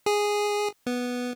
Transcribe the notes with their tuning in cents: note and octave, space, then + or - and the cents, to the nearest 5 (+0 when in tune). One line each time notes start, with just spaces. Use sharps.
G#4 -5
B3 -5